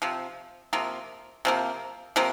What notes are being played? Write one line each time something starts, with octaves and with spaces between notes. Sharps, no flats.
C3 F3
C3 F3 A#3
C3 F3 A#3
C3 F3 A#3